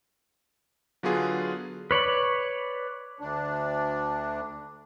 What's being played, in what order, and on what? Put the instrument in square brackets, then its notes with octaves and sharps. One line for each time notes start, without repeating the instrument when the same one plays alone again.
[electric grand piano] D3 F#3 B3 F4 G#4
[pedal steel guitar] B4 C#5 D5 B5
[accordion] D2 D4